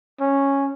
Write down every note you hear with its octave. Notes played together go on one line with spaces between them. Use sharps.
C#4